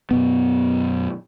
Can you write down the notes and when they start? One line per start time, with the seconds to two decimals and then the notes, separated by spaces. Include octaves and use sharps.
0.11 F#2 B2 B3